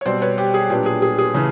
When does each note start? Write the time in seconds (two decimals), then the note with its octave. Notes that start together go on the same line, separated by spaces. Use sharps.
0.01 C#5
0.06 B2 G3 C4 C5 D5
0.22 B4 C#5
0.38 G4
0.54 G#4
0.70 A#2 F#3 B3 D4 G4
0.86 G#4
1.02 G#4
1.18 G#4
1.34 C#3 E3 A3